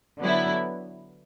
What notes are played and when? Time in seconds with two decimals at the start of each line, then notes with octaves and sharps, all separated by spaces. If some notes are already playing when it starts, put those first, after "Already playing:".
0.19 D3 F#3 B3 E4